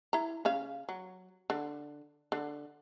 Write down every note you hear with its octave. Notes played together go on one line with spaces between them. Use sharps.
E4 A#5
C#3 C#4 F5
F#3
D3
D3